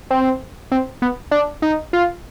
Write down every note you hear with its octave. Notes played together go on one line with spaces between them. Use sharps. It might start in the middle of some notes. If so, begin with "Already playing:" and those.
C4
C4
B3
D4
D#4
F4